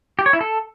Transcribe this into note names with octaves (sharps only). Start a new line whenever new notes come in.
G4
C#5
E4
A4